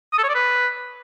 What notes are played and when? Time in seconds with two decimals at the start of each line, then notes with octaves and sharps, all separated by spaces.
0.13 D#6
0.18 A4
0.24 C#5
0.29 D5
0.35 B4